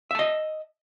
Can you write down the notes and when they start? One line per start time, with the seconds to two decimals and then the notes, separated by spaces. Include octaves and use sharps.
0.11 E5
0.15 A5
0.19 D#5